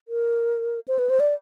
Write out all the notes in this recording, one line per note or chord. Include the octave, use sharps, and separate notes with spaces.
A#4
C5
B4
C5
D5